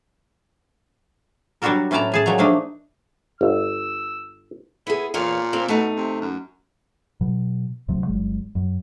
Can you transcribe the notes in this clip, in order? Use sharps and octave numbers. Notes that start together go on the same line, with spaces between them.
F#3 G3 D4 F#4 A4 A#4
A2 C#4 B4 D5 A5 A#5
A2 G#4 A5
A#2 F#3 G#3 C#5 A#5
F3 A3 A#3 D4 D#4
G1 E6
B3 E4 G#4
E2 A#2 C#5 F5
C4 F5
B2 A3 D#4
C3
F#2
B2 F#3
C#2 C3 F#3 A3
G1 F#3 G#3
F#2